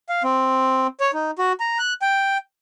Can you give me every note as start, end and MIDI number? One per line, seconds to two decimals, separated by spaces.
0.09 0.23 77
0.23 0.87 60
1.00 1.11 73
1.14 1.31 63
1.38 1.53 66
1.60 1.78 82
1.79 1.93 90
2.02 2.38 79